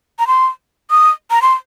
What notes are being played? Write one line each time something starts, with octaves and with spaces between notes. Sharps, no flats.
A#5
C6
D#6
A#5
C6